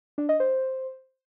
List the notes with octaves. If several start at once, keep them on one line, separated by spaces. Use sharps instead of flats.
D4
D#5
C5